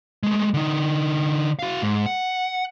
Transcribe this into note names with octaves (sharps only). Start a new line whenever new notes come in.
G#3 A3
D3 D#4
F#4 F5
G#2
F#5